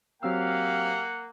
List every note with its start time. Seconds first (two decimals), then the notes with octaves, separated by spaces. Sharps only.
0.23 F#3 A#3 C4 G4 F5 F#5 E6